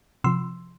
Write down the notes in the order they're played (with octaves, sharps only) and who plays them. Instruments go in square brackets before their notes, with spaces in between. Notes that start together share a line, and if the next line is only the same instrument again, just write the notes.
[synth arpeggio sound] C3 F3 C6 E6